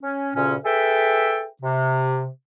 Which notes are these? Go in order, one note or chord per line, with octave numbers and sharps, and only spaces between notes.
C#4
D2 A#2 C#3 C#4
G#4 A4 B4 E5 G5
C3